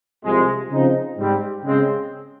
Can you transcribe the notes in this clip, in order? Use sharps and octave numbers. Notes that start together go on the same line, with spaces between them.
C2 C3 F3 G#3
C#3 F3 C4 D#4
G#2 G3 C4
C#3 G#3 C4